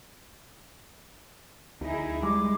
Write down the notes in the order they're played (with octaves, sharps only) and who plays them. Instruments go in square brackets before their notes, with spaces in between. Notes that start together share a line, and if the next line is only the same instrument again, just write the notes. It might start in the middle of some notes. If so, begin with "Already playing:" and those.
[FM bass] D2 [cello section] D#4 E4 G#4
[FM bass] G3 [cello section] G#3 [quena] D6